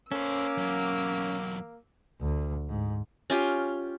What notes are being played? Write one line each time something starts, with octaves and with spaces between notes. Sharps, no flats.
A#3 C#4 A4 C5 D6 E6
E2 F#3
D2
G#2
C#4 F4 G4